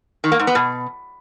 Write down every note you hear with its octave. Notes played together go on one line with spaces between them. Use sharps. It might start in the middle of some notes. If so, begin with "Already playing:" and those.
D#3
A#3
G#2
B3
B2